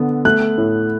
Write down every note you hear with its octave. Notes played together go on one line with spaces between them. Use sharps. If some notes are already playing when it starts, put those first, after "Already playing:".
Already playing: D3 B3
A3 F#6
A2